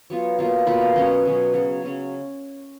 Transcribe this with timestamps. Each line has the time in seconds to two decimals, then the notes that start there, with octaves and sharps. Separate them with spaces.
0.10 F#3 B3 F4 C#6
0.39 B2 A#3 F4
0.67 B2 A#3 F4 B5
0.81 F5
0.96 B2 F#3 C#4 D#5
1.25 B2 F#3 C#4
1.53 C#3 F#3 C#4 C#5
1.81 C#3 F#3 C#4